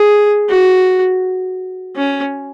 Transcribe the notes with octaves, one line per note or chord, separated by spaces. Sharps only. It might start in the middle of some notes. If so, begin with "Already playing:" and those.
Already playing: G#4
F#4
C#4